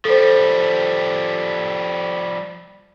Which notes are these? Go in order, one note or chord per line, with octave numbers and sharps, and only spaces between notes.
F3 G3 A4 C5